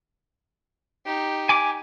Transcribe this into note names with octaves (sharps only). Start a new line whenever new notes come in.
D#4 G4
G#5 D6